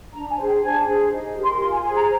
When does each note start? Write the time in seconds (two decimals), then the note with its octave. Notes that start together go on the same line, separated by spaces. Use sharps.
0.13 D4 A#5
0.29 G#5
0.37 G#4 C5
0.46 G5
0.62 D4 G#5
0.86 G#4 C5
1.10 D#4
1.35 G4 A#4
1.43 C6
1.59 F4 C6
1.71 G#5
1.83 G#4 G#5
1.88 C5
1.96 A#5